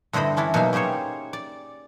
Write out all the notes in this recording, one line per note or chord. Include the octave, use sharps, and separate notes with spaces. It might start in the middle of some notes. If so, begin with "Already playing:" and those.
G2 D3 E4 C5 D#5 B5
E3 C#4 D4 E4
B2 F#3 A#3 D#4 E5 F5
C#4 G4 G#4 C5 C#5
D5